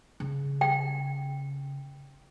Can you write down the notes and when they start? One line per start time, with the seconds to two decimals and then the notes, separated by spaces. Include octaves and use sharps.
0.20 C#3
0.61 G5